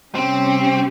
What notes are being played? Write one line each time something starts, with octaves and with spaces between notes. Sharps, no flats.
C3 G3 C4 C#4 G4